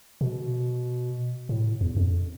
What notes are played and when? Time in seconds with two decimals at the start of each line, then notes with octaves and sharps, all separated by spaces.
0.21 B2
1.49 A2
1.81 E2
1.97 F2